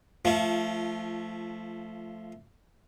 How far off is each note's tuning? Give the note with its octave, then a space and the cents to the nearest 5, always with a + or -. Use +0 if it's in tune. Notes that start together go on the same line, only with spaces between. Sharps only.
F3 -10 A3 +0 F4 -25